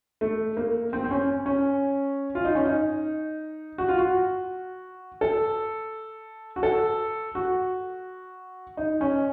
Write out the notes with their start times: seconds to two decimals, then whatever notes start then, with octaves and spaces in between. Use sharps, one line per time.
0.21 A3
0.57 A#3
0.93 C4
1.04 C4
1.11 C#4
1.46 C#4
2.35 F4
2.45 D#4
2.55 C#4
2.65 D#4
3.78 F#4
3.89 F4
3.98 F#4
5.21 A4
6.56 F#4
6.63 A4
7.35 F#4
8.77 D#4
9.01 C#4